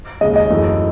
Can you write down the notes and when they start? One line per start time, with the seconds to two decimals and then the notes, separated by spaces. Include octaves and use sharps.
0.21 D#2 C#3 G#3 D#5
0.36 D#5
0.50 F#2 E3 A3